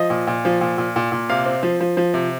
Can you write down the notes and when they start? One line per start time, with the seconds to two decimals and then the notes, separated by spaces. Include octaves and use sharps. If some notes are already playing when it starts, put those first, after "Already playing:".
Already playing: F3 D#5
0.10 A#2
0.27 A#2
0.45 F3
0.61 A#2
0.78 A#2
0.96 A#2
1.12 A#2
1.29 C3 F5
1.46 C4
1.63 F3
1.81 F3
1.97 F3
2.14 C3